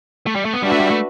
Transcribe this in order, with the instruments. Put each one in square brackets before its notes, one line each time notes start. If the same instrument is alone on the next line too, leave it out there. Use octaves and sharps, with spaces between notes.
[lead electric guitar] A3
G3
A3
B3
[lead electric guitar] G3 [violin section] D4 F#4 B4 E5
[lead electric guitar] A3
G3
A3